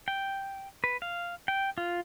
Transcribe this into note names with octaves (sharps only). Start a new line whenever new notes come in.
G5
B4
F5
G5
F4